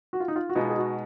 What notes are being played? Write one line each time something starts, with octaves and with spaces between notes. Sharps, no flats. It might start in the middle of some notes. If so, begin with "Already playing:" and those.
F#4
F4
D#4
F4
F#4
B2 G#3 B3 D#4 F4
G#4
F#4